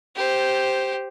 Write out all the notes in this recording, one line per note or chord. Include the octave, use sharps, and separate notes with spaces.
G4 C5